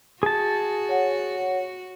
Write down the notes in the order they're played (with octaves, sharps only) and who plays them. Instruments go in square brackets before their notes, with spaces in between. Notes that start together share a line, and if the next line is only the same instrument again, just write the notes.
[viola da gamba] F#4 [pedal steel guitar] G#4 A5
[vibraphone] C#5 F#5